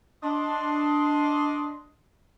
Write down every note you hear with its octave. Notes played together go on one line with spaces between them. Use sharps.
D4 D#5 C6